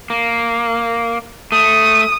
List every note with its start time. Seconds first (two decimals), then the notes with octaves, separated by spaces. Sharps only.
0.10 A#3
1.52 A3 D#6